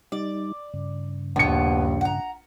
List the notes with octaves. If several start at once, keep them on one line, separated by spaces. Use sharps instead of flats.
G3 D#4 D5
G2 C#3
A#1 D#2 B2 B3 C#7
F#5 A#5